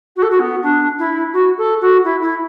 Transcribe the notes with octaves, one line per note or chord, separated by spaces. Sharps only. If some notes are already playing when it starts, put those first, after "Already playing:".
F#4
A4
F#4
B3
D4
E4
F#4
A4
F#4
E4
E4